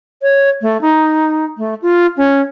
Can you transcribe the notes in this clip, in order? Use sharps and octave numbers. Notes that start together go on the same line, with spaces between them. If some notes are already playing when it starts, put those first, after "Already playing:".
C#5
A3
D#4
A3
F4
C#4